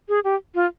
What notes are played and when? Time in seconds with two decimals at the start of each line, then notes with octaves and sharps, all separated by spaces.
0.09 G#4
0.24 G4
0.55 F4